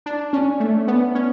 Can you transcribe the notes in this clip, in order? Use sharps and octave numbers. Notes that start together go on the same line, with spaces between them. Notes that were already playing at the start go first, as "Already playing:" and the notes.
D4
C#4
A3
B3
C#4